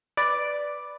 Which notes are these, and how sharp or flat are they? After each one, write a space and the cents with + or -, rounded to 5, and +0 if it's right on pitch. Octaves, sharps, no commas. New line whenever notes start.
B4 +0 D5 +0